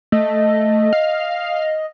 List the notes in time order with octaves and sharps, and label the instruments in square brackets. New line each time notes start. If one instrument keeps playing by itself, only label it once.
[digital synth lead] A3 [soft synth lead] D#5
[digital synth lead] F5